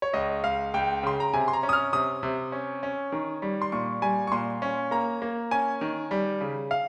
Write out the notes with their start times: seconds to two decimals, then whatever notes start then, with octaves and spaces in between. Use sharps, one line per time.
0.02 C#5
0.13 C#2 D#5
0.44 C#2 F5
0.74 C#2 G5
1.03 C#3 C6
1.20 A#5
1.34 C3 G#5
1.48 C6
1.53 A#5
1.63 C#4
1.69 D#6
1.73 F6
1.93 C3 D#6
2.23 C3
2.52 C#4
2.83 C#4
3.12 D#3
3.42 G3
3.62 C6
3.72 A#2 C#6
4.02 G3 G#5
4.27 C#6
4.32 A#2 C6
4.62 C#4
4.91 A#3 A#5
5.22 A#3
5.51 C#4 G#5
5.81 D#3
6.11 G3
6.41 C#3
6.71 F5